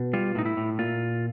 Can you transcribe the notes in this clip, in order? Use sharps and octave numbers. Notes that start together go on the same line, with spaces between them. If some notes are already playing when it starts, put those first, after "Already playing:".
Already playing: B2
G3 F4
A2 D#4
E4
A2
A#2 F4